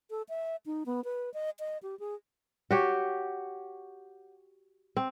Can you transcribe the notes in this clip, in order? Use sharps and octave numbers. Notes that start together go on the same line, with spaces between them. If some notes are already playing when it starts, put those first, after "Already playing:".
A4
E5
D#4
B3
B4
D#5
D#5
G4
G#4
F#4 G4 C#5
C4